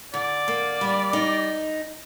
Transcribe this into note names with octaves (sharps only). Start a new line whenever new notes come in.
D3 D5
A#3
G3
D#4